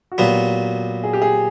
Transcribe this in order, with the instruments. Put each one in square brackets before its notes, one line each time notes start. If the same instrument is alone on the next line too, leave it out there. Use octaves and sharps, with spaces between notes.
[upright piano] F#4
[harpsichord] A#2 F#3 B3 [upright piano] G4
[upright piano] G#4
G4
G#4